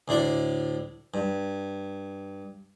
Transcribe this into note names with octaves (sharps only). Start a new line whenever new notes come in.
D2 A2 D4 D5
G2